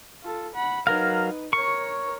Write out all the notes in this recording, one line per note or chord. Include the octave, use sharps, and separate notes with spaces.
F4 A4
F#5 B5
F#3 D#4 A#4 B4 F5
A#4 C#5 C#6